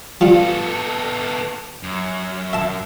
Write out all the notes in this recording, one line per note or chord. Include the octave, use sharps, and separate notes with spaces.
F3 G3 B3 F4 A4
F#2
E5 A5